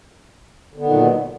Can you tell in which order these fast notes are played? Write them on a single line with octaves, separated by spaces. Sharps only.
D3 B3 D#3 A#2 F#3